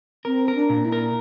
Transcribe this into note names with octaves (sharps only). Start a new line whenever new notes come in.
C4 A#4
A#4
D4
A#2
E4
A#4